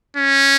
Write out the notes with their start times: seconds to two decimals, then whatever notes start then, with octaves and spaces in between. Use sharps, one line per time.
0.17 C#4